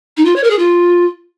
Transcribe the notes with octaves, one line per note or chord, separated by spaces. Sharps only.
D#4
F4
C#5
A#4
G#4
F4